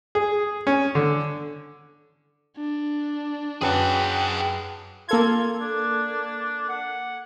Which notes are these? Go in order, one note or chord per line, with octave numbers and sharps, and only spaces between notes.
G#4
C#4
D3
D4
F#2 G#4 B4 F#5 G5 A5
A#3 F4 A4 G#6
D4
F#5